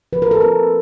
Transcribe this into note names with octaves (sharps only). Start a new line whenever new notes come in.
F3 B4
A#4
A4
C4 A#4